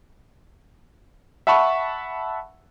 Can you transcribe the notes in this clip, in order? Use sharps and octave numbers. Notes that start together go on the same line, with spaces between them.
E5 F#5 A5 B5 C#6